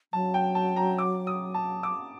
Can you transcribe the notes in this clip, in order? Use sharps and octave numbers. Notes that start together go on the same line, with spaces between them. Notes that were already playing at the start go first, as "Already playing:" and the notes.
F#3 A5
G5
A5
A#5
D6
D#6
A5
D6